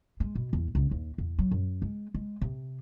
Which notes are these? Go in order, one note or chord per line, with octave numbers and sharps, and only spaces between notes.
G#3
B2
E2
C#2
D#2
E2
F#3
F#2
G#3
G#3
C3